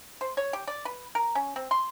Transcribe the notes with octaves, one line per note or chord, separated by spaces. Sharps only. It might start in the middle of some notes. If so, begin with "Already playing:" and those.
C5
C#5
G4
D5
B4
A#4
C#4
C4
C6